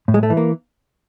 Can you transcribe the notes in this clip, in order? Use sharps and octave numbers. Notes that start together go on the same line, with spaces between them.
A2
G#3
A3
E3
A#3